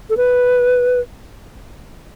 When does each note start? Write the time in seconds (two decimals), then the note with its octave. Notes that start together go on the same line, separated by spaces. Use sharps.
0.10 A4
0.17 B4